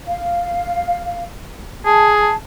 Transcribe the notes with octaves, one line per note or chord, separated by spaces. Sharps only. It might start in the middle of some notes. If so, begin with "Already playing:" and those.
F5
G#4 A5